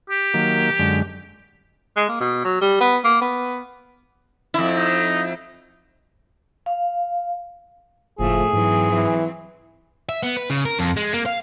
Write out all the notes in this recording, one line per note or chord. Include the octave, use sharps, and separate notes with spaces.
G4
D#3 F#3 A#3
F#2 D3 G#3
G#3
A#3
B2
F#3
G3
B3
A#3
B3
F2 E4
D#4
F5
F#1 A2 F3 A3 G#4
G#2 E3 F#3 C4
E3
E5
B3
B4
C#3
A#4
F2
G#3
A#3
F5